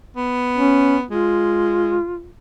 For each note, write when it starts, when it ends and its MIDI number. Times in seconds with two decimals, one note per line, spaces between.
0.17 1.04 59
0.58 0.97 61
1.11 1.98 56
1.11 2.28 65